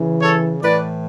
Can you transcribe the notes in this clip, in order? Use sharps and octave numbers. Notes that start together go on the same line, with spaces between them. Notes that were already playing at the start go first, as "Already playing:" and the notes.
Already playing: C#3 E3
A4 C#5
A2 E3 B4 D5